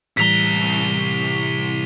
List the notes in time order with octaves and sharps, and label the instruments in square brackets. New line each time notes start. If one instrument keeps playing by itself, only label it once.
[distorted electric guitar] C2 A#5 [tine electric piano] A2 E3 G3 [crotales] B6 F7 G7